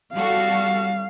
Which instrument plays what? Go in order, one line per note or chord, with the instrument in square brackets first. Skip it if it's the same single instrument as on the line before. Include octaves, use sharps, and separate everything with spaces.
[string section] G3 F#4 A4 [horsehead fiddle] F5